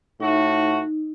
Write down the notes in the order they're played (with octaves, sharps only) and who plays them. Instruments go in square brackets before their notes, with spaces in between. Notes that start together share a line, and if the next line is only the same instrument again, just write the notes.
[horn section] A2 A3 F#4 [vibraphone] D#4